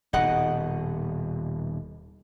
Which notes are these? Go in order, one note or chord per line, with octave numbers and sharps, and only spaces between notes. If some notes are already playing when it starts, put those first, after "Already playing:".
D#1 B2 D#4 D#5 F#5